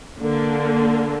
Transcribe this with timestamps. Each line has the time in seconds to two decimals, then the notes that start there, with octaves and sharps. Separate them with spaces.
0.19 D3 A#3